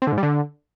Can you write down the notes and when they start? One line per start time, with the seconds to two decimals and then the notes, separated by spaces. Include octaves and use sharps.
0.02 C4
0.07 D3
0.12 G#2
0.18 G3
0.23 D3